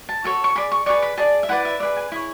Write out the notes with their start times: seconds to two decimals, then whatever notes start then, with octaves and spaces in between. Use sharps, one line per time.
0.09 A5
0.24 F#4 A4 C#5
0.44 C#6
0.56 G#4 D5 B5
0.72 C#6
0.86 G#4 B4 D5 C#6
1.02 B5
1.17 G#4 D5 A5
1.43 E5
1.49 E4 B4 D5 F#5
1.65 E5
1.80 G#4 B4 D5 E5
1.97 G#5
2.12 E4 G#4 C#5